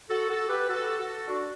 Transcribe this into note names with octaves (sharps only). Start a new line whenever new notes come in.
F#4 A4
F#4 A4
G4 B4
F#4 A4
F#4 A4
D4 F#4